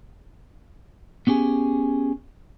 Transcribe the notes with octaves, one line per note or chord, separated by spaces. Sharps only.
B3 C#4 G4 G#4